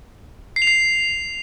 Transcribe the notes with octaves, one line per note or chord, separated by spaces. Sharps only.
C7
F7
C7